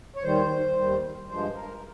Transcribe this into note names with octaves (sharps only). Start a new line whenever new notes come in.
C#5
D#2 D#3 G3 C5
D#2 D#3 G3
G2 F3 G#3 C5
A#4